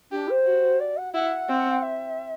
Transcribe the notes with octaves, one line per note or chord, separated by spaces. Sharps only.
D4 G4
C5
F#4
D5
F#5
E4 F#5
C4
E5